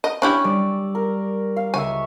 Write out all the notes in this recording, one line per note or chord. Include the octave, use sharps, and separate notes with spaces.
D#5
C#4 D4 E4 G4
G3 D5 E6
A#4
F5
C#2 C#5 E5 G#5